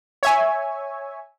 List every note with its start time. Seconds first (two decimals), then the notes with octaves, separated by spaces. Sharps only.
0.23 C#5 E5 G#5